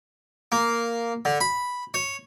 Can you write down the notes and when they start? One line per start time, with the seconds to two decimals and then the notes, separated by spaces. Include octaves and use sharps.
0.52 A#3
1.25 D3
1.41 B5
1.94 C#5